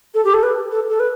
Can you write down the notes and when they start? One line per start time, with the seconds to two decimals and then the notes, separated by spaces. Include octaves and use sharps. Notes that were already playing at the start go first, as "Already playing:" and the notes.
0.15 A4
0.25 G4
0.34 A4
0.43 B4
0.72 A4
0.90 A4
1.00 B4